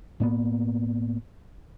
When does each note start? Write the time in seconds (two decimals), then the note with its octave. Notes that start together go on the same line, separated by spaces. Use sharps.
0.20 A2 A#3 B3